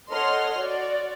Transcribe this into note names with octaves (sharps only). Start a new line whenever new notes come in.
A4 C#5 D#5 F#5 C6 F6
F#4 D5